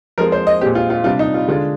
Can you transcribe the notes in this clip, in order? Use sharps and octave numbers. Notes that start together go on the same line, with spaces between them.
F3 G#3 C4 A#4
C5
D#5
A#2 G#3 C4 G4
F4
F4
C3 G3 D4 F4
D#4
F4
D3 G#3 D4 F4